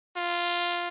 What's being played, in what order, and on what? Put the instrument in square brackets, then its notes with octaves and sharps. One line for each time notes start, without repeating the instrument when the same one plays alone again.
[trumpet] F4